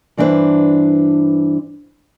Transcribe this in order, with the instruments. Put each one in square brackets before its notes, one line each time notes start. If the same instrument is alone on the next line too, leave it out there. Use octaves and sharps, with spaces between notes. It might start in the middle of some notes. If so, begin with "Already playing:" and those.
[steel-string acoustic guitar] G2 E3 D4 D#4 B4 C5